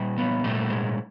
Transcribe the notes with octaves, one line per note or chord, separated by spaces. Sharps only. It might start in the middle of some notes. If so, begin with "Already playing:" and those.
Already playing: A#2 G3
B3
A#2 G3 A3
G#3